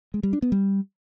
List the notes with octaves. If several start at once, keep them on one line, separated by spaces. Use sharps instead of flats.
G#3
G3
D4
B3
G3